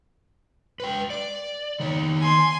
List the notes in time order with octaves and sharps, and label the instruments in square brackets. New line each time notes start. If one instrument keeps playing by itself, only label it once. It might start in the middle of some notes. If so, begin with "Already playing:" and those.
[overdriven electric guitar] B4 G5
D5
D#3 C#5
[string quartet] G#5 C6